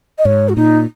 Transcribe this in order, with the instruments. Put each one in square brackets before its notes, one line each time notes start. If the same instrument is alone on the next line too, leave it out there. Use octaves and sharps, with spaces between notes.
[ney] D#5
[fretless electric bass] G#2 [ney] C#5
[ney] F#4
[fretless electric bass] A#2 [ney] D#4